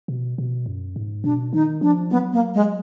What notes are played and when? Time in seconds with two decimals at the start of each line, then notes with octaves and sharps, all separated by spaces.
0.08 B2
0.38 B2
0.66 F#2
0.96 G#2
1.24 B2 D4
1.53 D#3 D#4
1.81 F3 D4
2.10 F#3 B3
2.33 A#3
2.54 G#3